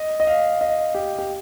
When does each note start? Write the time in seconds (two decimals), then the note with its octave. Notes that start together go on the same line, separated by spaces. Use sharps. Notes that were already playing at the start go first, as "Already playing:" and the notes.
Already playing: D#5
0.20 D#5
0.27 F5
0.61 D#5
0.95 G4
1.19 G4